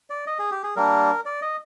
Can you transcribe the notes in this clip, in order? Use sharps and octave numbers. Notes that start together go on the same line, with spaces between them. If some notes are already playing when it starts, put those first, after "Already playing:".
D5
D#5
G#4
G4
G#4
G3 A#3 D4 A#4
D5
D#5